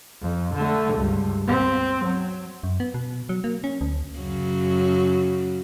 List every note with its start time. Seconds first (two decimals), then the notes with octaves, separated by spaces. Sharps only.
0.21 F2
0.55 D3 A3
0.94 C#2 G2
1.48 C4
2.05 F#3
2.63 F#2
2.80 B3
2.94 B2
3.29 F#3
3.44 A#3
3.64 C#4
3.81 D2
4.19 F#2 C#3 F#3